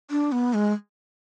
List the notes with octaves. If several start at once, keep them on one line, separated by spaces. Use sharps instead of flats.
D4
B3
G#3